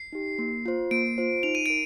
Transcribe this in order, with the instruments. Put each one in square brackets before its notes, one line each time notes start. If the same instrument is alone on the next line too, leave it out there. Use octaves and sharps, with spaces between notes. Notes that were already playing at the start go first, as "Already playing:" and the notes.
Already playing: [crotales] C7
[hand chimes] D#4 G4
A#3
F4 C5
[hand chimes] A#3 [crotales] D7
[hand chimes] F4 C5
[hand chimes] D#4 [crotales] F7
[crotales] D#7
[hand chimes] A#4 [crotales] D7